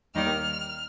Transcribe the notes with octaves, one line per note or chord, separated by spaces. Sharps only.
D#2 D#3 G3 A#3 D#4 F6